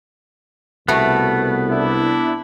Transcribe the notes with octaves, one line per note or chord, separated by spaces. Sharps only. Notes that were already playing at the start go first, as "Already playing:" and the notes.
C2 B2 A3 B3
D4 E4